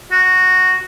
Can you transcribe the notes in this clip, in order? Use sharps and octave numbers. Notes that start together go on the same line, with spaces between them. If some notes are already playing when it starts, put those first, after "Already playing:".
F#4